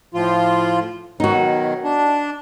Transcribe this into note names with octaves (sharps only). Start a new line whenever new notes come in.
A2 F3 F4
B2 D#3 F#3 D#4 F#4
D4